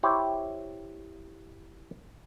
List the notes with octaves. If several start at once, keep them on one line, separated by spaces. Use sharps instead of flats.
E4 G4 C5 C#5